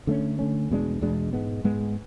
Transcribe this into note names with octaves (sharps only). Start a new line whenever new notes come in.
D3 A3 C#4
D3 A3 C#4
E2 B2 G#3 D4
E2 B2 G#3 D4
G#2 G#3 B3
G#2 G#3 B3